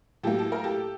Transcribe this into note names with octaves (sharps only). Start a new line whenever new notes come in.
A2 F#3 A#3 G4 A4
A4
A#4
G4 A4